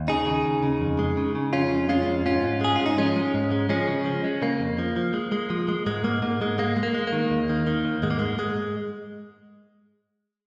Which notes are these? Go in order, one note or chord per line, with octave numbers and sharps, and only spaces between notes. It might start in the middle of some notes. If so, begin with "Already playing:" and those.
Already playing: D#2
C#3 D#4 G#4
C#3
D#2
C#3
F2
G#3
C#3
C#3
F2 C#4 F4
F2
G#3 C#4 F4
F2
G#2 C#4 F4
G#2
G#3 G#4
G#2 F4
D#4
F3 G#3 C#4
G#3
G#2
G#3
F3 G#3 C#4
C#3
F3
G#3
C#3 A#3
F2
F3
F3
G#3
G#3
F3
G#3
G#2 G#3
G#2 A#3
G#2 A#3
G#2 G#3
G#3 A#3
G#3
A#3
G#3
A#3
D#3
D#2
D#3
D#3
D#2
G#2 G#3
A#3
G#2 G#3
G#2 G#3